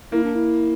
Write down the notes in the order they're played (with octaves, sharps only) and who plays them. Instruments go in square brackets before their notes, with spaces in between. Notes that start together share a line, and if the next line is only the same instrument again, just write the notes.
[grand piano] A#3 [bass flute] E4
[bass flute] D4
E4